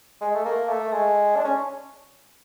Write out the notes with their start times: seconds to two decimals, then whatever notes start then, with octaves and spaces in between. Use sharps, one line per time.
0.21 G#3
0.35 A3
0.45 A#3
0.69 A3
0.92 G#3
1.36 D4
1.45 C#4